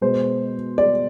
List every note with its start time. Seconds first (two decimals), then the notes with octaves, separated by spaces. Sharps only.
0.01 B2 G#3 B3 C5
0.78 D5